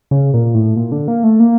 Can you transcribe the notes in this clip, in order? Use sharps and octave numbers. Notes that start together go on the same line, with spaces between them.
C#3
A#2
A2
A#2
D3
A#3
A3
A#3